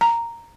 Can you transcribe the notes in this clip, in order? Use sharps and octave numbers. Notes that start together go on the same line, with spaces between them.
A#5